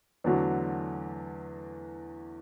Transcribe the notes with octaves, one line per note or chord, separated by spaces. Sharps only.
E2 D3 F#3 A3 F#4